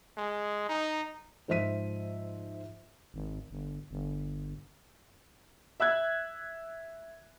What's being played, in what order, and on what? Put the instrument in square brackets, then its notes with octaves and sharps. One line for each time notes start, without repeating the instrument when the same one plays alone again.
[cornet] G#3
D#4
[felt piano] G#2 F3 C5 E5 B6 D#7
[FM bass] G#1
G1
G1
[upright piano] E5 E6 F#6 G#6